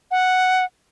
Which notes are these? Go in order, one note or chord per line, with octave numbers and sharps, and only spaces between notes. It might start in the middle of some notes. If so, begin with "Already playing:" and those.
F#5